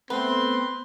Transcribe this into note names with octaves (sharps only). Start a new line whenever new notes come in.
A3 B3 C4 B4 C6